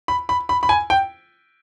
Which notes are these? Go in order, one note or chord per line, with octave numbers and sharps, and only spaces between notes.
B5
B5
B5
B5
G#5
G5